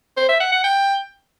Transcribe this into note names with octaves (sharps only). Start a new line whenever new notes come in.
C5
E5
F#5
F#5
G5